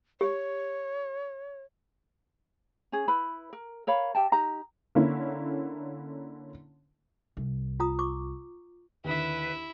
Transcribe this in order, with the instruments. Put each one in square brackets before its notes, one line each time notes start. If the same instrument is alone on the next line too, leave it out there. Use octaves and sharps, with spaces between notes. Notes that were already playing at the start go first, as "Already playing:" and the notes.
[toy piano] G4 [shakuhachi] C#5
[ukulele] C#4 G#4
E4 B4 B5
A#4
A#4 C#5 F5 B5
G4 E5 G5 A5
D#4 G4 A#5
[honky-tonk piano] D3 A#3 C#4 E4
[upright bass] C2
[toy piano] F4 A#5 D#6
C#6 D6
[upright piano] D#2 D3 [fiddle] E4 E5 [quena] B4